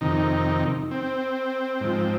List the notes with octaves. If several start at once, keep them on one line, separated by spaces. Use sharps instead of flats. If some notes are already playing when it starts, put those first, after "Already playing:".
F2 C3 D#3 D#4
C4
G#2 F3